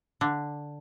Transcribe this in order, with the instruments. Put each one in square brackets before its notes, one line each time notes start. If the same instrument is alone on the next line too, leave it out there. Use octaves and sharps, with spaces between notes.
[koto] D3